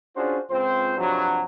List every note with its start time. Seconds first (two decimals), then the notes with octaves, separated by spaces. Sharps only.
0.16 C#4 D4 F4 F#4 G#4 C5
0.50 C#2 C4 F4 C5
0.97 G2 C3 F3 F#3